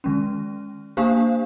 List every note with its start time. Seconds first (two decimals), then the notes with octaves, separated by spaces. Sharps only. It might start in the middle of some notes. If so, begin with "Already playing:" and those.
0.04 D#3 G#3 C#4
0.97 A#3 D4 G4 C5 F5